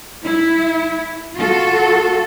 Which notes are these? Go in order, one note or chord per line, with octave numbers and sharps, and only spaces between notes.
E4
F4 F#4 A4